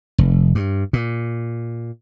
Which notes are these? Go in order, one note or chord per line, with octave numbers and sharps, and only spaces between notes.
F1
G2
A#2